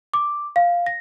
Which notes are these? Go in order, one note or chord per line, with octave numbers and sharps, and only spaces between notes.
D6
F5
A#6